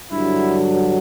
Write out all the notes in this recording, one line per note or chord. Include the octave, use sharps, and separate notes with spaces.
G2 D3 F#3 E4